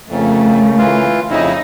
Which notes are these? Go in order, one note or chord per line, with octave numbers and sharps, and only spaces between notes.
F2 C#3 A3 A#3 C#4
E3 F4
F2 C#3 D#4 E4